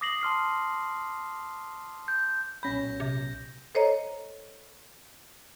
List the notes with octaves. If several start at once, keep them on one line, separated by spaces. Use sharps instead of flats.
D6 D#6 A#6 C7 F#7
A5 C6 F6 C7
G6
B1 A#2 C#4 B5 G6 A#6
C3
A4 C5 C#5 D#5 A#5